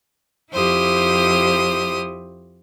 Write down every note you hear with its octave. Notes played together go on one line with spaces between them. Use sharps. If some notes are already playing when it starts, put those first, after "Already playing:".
F2 E4 G4 C5 D#6